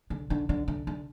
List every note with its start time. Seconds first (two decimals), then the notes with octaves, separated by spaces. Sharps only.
0.10 D3
0.30 D3
0.49 D3
0.68 D3
0.87 D3